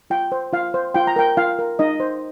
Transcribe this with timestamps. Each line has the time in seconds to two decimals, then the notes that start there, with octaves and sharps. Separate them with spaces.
0.10 F4 G5
0.32 C5
0.53 F4 F5
0.74 C5
0.94 F4 G5
1.07 A#5
1.16 A#4 G5
1.37 F4 F5
1.59 A#4
1.79 D#4 D#5
2.00 C5